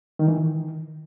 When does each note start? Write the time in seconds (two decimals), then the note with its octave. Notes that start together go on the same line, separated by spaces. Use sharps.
0.19 D#3
0.28 E3
0.37 D#3